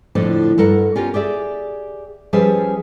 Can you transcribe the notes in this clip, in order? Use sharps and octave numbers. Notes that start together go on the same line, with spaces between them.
F2 A2 D3 F3
G2 A4 A#4 F#5
C#4 F4 G4 A#4
G4 G#4 D5 E5
F3 G3 C#4 G#4 B4 E5